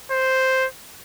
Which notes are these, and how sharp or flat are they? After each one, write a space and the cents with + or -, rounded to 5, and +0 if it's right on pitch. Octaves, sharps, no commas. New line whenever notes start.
C5 +0